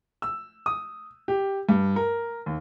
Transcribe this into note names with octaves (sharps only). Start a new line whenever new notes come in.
E6
D#6
G4
G2
A#4
D#2